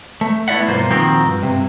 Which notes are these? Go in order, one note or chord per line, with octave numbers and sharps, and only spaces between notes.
A3
A3 B3 E4 D5 E5 F#5
B1 G2 A#3 F4 C5
A#2 D#3 F3 C4 F#4 G4
G2
G2 C3